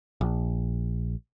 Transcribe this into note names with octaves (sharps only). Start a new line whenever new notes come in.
A#1